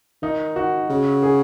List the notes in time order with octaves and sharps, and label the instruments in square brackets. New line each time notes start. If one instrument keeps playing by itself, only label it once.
[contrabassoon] D#3 [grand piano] D#4
[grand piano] F#4
[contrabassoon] C#3
[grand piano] G#4